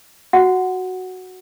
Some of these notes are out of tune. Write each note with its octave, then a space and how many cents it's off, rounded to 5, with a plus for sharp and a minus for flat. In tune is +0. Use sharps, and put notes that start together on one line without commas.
F#4 +0 F#5 +0